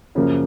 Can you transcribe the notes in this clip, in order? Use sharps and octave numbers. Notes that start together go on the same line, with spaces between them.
F#2 C#3 F3 A#3